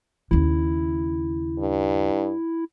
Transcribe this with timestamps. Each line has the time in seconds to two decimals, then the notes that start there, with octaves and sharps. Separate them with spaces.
0.31 D#2 C#3 E4
1.59 G2